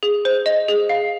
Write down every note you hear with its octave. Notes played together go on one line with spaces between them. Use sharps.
G#4
C5
D#5
G#4
F5